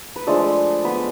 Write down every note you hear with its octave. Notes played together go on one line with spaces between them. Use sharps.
B4
F3 G#3 A3 D4 A4
B3 B4